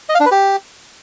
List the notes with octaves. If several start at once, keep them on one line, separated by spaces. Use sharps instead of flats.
D#5
F5
D4
B4
G4